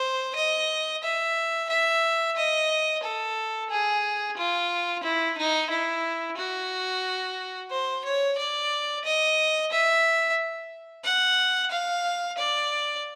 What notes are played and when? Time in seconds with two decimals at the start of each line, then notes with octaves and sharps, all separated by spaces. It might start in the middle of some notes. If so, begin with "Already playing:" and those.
Already playing: C5
0.36 D#5
1.03 E5
1.70 E5
2.37 D#5
3.03 A4
3.70 G#4
4.37 F4
5.04 E4
5.38 D#4
5.70 E4
6.37 F#4
7.71 C5
8.05 C#5
8.38 D5
9.05 D#5
9.72 E5
11.05 F#5
11.71 F5
12.38 D5